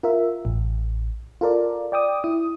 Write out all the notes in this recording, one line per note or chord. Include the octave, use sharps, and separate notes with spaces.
F4 A#4 E5
A1
F4 A4 A#4 D5
D5 G5 D6 D#6
E4 D#6